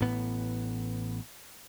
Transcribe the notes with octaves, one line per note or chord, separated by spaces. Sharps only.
A1 A2 B3